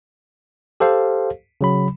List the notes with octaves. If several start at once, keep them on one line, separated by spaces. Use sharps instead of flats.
G4 A4 C5 F5
C#3 F#3 B5